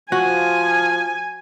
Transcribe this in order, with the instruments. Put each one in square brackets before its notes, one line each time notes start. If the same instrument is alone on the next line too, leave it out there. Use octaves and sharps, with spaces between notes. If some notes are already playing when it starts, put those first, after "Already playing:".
[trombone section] F3 [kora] F#4 [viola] G#5